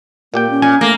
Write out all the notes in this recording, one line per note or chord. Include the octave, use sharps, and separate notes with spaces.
A#2 A#3 G4 G5
C#4
A#2 G#5
A3 A#3